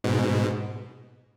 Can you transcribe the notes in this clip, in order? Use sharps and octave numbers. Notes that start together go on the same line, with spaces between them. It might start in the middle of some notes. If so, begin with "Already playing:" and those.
G#2 B2